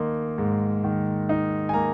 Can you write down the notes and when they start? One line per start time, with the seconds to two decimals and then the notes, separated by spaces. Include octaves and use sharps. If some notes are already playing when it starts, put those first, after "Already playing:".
Already playing: D#3 A#3 D#4 C6
0.38 G#2
0.84 D#3
1.29 D#4
1.69 G#5
1.74 A#3 A#5